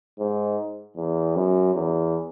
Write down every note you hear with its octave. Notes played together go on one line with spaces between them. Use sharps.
G#2
E2
F#2
E2